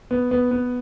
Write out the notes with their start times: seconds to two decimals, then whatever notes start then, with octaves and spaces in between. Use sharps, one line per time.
0.11 B3
0.31 B3
0.51 B3